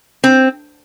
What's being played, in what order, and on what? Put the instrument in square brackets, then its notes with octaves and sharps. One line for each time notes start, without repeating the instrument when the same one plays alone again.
[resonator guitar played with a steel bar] C4